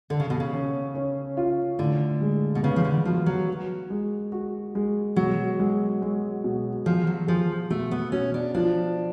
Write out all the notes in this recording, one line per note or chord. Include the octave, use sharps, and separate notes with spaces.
D3 A4
C#3
B2
C#3
C#4
C#4
F4
A2 D3
G#3
B2
C#3 B3
F3
D3
F3 F#4
F#3
F#4
G#3
F#4
G#3
B2 F#3
G#3
G#3
B2
F3 G#4
F#3
F3 G#4
B2 A3
B3
B2 C#4
D4
F3 D4